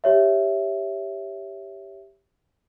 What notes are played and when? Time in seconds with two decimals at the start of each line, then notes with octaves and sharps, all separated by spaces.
0.04 G4 C#5 E5